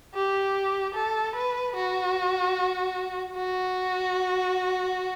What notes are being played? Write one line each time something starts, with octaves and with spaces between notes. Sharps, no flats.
G4
A4
B4
F#4
F#4